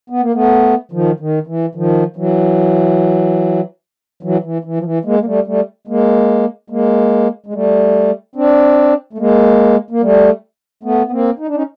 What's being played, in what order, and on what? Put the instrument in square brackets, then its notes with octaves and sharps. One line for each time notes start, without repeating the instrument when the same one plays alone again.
[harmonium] B3
A#3
A3 B3
D#3 F3
D#3
E3
D#3 F3
E3 F#3
E3 F#3
E3
E3
F3
E3
G#3 A#3
A#3
G3 A3
G3 A3
G#3 A#3
G#3 A#3
G#3
G3 A3
C4 D4
A3
G#3 A#3
A#3
G3 A3
A3 B3
B3
A#3 C4
D#4
D4
C#4 D#4